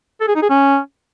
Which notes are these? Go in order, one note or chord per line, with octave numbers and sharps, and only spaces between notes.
A4
G#4
D#4
G#4
C#4